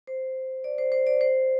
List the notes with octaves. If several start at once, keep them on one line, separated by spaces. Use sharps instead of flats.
C5
D5
C5
C5
D5
C5